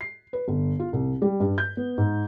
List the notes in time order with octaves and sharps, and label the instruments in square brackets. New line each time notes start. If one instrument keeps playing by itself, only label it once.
[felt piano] C7
B4
G1
F4
C2
G3
G2
G6
B3
G#2